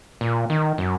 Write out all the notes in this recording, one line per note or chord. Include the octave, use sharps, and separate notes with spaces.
A#2
D#3
F#2